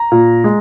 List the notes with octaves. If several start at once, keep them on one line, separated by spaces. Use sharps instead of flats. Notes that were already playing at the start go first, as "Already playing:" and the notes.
Already playing: A#5
A#2
G#3